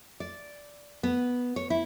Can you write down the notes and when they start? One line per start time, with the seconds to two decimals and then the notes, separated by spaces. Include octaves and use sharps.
0.20 D5
1.03 B3
1.56 C#5
1.70 E4